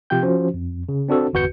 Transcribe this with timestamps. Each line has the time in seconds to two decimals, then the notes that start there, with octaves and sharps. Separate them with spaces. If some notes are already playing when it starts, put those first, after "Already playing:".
0.10 C3 F3 F4 G4 G5 G6
0.23 F3 C#4 F#4 C5
0.54 F2
0.89 C#3
1.08 C4 D4 F#4 A4 C5
1.33 G1 E2 F#4 B4 G6 C#7